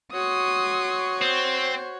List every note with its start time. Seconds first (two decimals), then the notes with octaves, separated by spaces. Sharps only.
0.13 F#4 C#5 C6 D#6
1.22 C4 C5